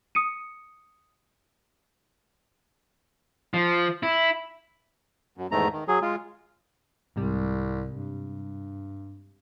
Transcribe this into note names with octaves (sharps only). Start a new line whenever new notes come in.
D#6 C#7 D#7
F3
E4
F#2
E2 G#2 D#3 A3 A#5
D#3
F#3 G#4
G#3 F4
C2 G#2 C3 G3
G2